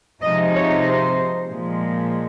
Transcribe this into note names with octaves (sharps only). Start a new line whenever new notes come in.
C3 F3 G#3 D#4 D#5
C#5
C5
A#2 F3 G#3